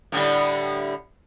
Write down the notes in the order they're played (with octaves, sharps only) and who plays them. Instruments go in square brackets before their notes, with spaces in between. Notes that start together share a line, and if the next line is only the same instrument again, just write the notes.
[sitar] A2 D3 G3